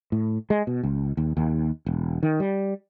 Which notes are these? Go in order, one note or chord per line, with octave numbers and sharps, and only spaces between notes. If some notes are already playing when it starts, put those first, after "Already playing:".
A2
G#3
B2
C#2
D#2
D#2
E1
D#3
G3